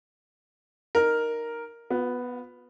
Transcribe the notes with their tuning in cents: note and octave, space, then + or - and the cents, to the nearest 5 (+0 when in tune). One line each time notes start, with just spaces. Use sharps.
D#4 -10 A#4 +0
B3 +0 F4 +45